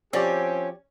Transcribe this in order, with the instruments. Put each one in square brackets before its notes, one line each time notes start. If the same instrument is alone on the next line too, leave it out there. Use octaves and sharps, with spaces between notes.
[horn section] F3 C4 G4 [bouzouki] C#4 [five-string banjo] F#4 D5 A#5